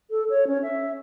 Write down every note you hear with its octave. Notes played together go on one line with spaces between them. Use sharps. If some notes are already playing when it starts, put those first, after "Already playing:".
A4
C#5
C#4
E5